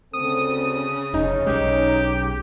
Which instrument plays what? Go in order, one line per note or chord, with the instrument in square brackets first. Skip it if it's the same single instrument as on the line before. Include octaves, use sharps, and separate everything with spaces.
[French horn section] D2 C4 A4 [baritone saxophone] C#3 [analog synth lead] D#6
[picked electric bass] F1 [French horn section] C#4 [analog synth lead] D#4
[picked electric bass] B1 G#3 [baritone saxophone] G4